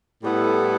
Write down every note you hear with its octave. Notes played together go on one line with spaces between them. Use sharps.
A2 G3 B3 E4 A4